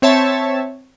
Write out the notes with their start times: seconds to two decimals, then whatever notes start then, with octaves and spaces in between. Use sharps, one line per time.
0.02 C4 C#5 E5 A5